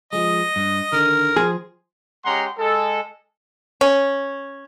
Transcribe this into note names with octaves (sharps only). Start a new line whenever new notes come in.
F3 G#3 D#5
G2
D3 D#3 A#4
F3 G#4 C5
G#3 C#4 G4 F#5 A#5 C6
G#3 A4
C#4